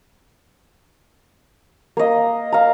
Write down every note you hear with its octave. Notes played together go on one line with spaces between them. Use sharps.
A#3 D#5
F5 A#5